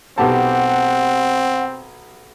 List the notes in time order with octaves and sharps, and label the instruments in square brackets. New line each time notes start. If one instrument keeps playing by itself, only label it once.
[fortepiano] B1 G4 A5 [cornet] C4 [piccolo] F#5